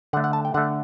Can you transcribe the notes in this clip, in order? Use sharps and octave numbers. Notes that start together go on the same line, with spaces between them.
D3 A3 F#5
F#5
A5
G5
D3 A3 F#5